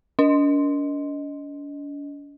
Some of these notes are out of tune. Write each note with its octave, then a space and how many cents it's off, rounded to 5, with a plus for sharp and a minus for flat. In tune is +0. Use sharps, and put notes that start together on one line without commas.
D4 -45 D#5 +0